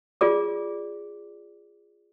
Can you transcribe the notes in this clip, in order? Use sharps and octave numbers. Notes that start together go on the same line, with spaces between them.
F4 G#4 D5 D6